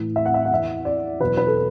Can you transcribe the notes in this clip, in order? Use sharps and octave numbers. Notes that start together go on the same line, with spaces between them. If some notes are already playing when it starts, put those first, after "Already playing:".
Already playing: A2 E3
E5
F#5
E5
F#5
E2 E3 E5
D5
E2 B2 F#3 B4
B4
A4